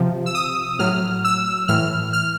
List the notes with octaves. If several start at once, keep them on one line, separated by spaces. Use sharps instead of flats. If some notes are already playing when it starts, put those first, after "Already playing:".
Already playing: C3 F3
E6
D#6
A2 F#3 F6
E6
A2 E3 F6
F6